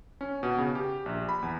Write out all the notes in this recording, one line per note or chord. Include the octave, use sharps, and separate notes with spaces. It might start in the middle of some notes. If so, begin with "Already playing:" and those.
C#4
B2
C#3
G4
A#1
B5
E2